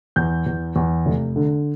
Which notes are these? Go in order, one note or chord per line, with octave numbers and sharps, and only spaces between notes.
E2 G6
E2
E2
F1
D3